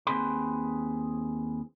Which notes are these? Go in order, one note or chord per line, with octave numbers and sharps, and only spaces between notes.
D#2 C3 C4 G#4 B4 C6